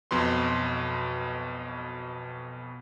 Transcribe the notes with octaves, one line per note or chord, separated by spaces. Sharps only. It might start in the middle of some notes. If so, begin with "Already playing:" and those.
B1 F2 B2 B4 C6